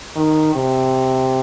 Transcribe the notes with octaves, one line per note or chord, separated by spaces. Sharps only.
D#3
C3